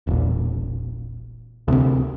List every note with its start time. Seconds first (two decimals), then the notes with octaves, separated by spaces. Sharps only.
0.07 E1 A#1
1.68 D2 C3 C4